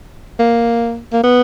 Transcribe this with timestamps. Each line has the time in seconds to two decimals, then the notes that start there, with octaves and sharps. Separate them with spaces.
0.39 A#3
1.13 A#3
1.24 B3